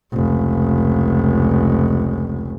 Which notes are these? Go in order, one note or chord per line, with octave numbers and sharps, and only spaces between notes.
F1 C#2